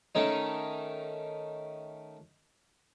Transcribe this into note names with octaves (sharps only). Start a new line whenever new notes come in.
D#3 A3 C#4 D#4